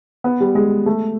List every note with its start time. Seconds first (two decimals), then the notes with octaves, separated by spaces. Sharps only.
0.24 B3
0.40 G3
0.55 G#3
0.86 A3